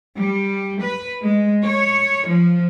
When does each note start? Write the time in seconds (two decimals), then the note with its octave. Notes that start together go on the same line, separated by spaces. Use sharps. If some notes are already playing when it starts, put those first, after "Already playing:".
0.18 G3
0.81 B4
1.22 G#3
1.63 C#5
2.27 F3